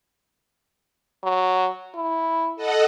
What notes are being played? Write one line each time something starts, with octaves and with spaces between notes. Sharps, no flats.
F#3
E4
A4 D#5 F#5